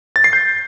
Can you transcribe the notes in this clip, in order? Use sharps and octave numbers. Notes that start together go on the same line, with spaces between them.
A6
C7
G6